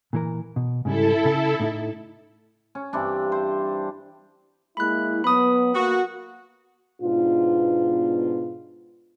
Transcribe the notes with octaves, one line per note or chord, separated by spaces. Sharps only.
A#2 E3 A#4
B2
G#2 C#3 G3 E4 A4
C#3 A5
A2 D#4 E4
C#4
G2 E3 C4 D4
C5
G#3 A#3 E4 B5 F#6
F#3 B3 B5 D#6
A#3 F#4
G#2 B2 B3 D4 F4